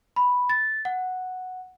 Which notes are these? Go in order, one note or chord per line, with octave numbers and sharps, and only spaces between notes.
B5
A6
F#5